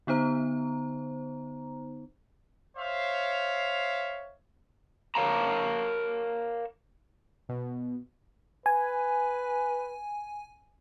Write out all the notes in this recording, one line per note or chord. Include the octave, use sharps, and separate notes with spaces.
D3 B3 D#4 C5 A#5
C5 C#5 E5 F5
A#4 C#5 F5 A5 A#5
B2
B4 G#5